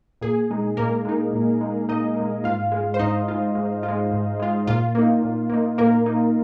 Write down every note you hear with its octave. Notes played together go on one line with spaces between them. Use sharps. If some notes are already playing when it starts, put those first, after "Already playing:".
A#2 G#4
G#3 D#4
A#2 A#3 A#4
G#3 D#4
A#2
G#3 D#4
A#2 D#4 D#5
G#3 D#4
G#2 F4 F5
G#3 F4
C5
G#2 D#4 D#5
G#3 F4
G#2
F4
G#3
G#2
G#3 F4
A#2 F4
A#3 D#4
A#2
A#3 D#4
A#2 A#3 A#4
A#3 D#4